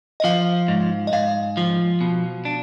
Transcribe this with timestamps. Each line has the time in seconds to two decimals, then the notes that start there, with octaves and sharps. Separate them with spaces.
0.20 D#5
0.24 F3 F5
0.68 G#2
1.07 D#5
1.13 G#2 F5
1.57 F3
2.01 B2
2.45 D4